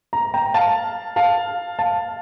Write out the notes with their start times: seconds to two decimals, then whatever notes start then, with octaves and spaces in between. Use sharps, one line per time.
0.13 A#5
0.34 G5 A#5
0.54 F5 A5
1.16 F5 A5
1.79 F5 A5